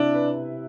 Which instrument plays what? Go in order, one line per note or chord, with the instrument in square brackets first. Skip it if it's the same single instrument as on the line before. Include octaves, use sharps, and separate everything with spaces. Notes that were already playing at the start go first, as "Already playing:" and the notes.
Already playing: [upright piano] C3 E4 [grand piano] D4
[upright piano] B4